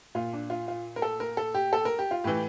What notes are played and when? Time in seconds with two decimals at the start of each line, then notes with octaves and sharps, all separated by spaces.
0.15 A#2 F4
0.33 D4
0.50 F4
0.68 F4
0.96 A#4
1.02 A4
1.20 A#4
1.37 A4
1.54 G4
1.73 A4
1.85 A#4
1.99 G4
2.11 F4
2.24 A2 E3 G4